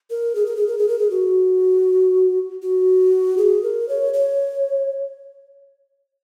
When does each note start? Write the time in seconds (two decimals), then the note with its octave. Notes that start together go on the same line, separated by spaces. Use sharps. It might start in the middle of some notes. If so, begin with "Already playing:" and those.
0.10 A#4
0.35 G#4
0.46 A#4
0.56 G#4
0.67 A#4
0.78 G#4
0.88 A#4
0.99 G#4
1.11 F#4
2.62 F#4
3.38 G#4
3.63 A#4
3.89 C#5
4.14 C#5